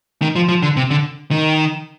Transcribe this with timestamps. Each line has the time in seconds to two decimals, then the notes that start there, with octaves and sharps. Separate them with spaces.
0.22 D#3
0.36 F3
0.49 F3
0.63 D3
0.77 C3
0.90 D3
1.31 D#3